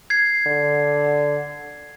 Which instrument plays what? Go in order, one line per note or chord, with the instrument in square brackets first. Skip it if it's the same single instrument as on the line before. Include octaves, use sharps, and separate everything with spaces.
[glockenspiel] G#6 C7
[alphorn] D3